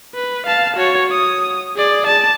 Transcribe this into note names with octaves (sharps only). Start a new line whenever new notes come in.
B4
F5 A5
F#4 C#5
D#6
G#4 D5
A5